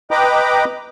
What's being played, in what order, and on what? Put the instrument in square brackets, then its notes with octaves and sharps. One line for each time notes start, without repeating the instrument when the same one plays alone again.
[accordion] B4 D#5 G5 A#5 B5 D6